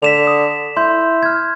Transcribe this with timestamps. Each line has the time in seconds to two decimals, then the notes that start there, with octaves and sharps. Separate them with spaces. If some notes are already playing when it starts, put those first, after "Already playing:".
0.03 D3 B6 E7 F7
0.27 D#6
0.77 E4 C6 G6
1.23 F6 G#6